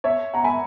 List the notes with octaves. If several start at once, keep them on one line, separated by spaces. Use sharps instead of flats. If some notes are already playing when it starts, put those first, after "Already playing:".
C#5 E5
F#5 A#5
G#5 B5